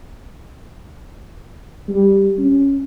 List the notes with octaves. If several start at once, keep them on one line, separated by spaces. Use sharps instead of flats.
G3
C#4